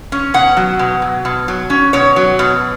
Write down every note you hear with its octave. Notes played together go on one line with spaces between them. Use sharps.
C#4
B2 F#5
F#3
B2
F#3
B2
F#3
C#4
B2 C#5
F#3
B2